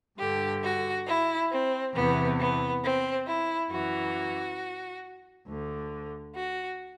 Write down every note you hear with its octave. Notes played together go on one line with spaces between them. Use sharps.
G2 D3 G4
F#4
E4
C4
E2 C3 E3 B3
B3
C4
E4
F#2 E3 F#4
D2 D3
F#4